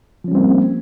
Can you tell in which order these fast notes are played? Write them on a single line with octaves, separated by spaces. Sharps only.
F3 C#4 G3 C4 A#3